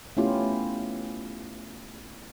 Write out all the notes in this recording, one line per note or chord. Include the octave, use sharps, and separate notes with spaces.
A3 B3 C#4 E4 F4 G4